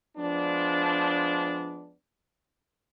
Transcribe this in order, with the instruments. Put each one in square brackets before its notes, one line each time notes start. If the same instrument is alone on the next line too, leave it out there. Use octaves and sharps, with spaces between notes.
[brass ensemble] F3 G#3 B3 D4